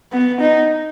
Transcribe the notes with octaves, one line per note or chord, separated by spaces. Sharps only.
B3
D#4